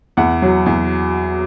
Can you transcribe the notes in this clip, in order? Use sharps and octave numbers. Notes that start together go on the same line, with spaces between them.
E2 F#5
F#3
E2